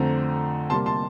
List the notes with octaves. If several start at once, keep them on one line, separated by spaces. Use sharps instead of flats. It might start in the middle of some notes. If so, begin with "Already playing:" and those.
Already playing: F2 D3 A3 C4 A#5
C3 G3 A#3 A5 C6
A5 C6